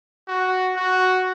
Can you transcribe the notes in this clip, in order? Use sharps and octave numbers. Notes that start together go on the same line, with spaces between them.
F#4
F#4